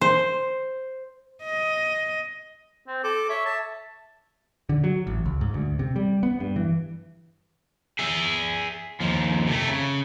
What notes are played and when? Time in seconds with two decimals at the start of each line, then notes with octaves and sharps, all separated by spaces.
0.01 C5
1.44 D#5
2.88 C4
3.04 A4 D6
3.29 C#5 E5
3.45 A5
4.69 D3
4.84 F#3
5.07 A1
5.26 C#2
5.41 G#2
5.54 D2
5.79 C3
5.96 G3
6.23 B3
6.40 G2
6.56 E3
7.99 G#4 E5
9.00 D#2 F3
9.47 C3 A3
9.69 C#3